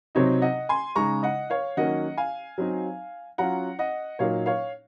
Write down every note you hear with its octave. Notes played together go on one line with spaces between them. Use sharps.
C3 F#3 C4 D#4 C#5
D#5 F#5
G#5 C6
C#3 G#3 D#4 A#5 C#6
D#5 F#5
C#5 F5
D#3 F#3 A#3 C#4 D#5 F#5
F5 G#5
F#3 C4 D#4
F#3 C#4 F4 F#5 A#5
D#5 F#5
A#2 F#3 A#3 D#4 C#5 F5
C#5 F5